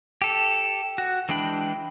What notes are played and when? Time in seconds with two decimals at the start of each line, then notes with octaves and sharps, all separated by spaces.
0.22 G4 A4
0.98 F#4
1.29 E3 G#3 D4 G5 B5